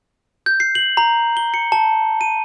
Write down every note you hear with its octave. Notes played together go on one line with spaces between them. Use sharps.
G6
C7
F#7
A#5
G7
C#7
A5
D#7